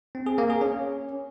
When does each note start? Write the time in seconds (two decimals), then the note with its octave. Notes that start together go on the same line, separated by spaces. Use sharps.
0.15 C4
0.26 G#4
0.38 A#3
0.50 G#4
0.61 C#4